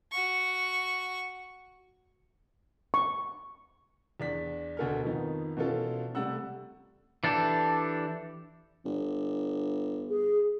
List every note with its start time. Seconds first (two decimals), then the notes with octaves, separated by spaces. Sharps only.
0.12 F#4 C#6
2.94 C#6
4.20 E2 D4 B6
4.77 D2 B2 A4 G#5 F6
5.03 F2 D#3 F3 B3 D#4
5.57 B2 E3 C#4 F4 A4
6.15 C3 G3 A3 F#5 E6
7.24 E3 D4 G4 A4
8.85 G1
10.09 G#4